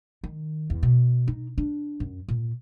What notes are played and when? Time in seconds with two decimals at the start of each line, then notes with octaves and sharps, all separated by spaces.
0.24 D#3
0.70 E2
0.83 B2
1.28 D#4
1.58 D4
2.00 F#2
2.28 A#2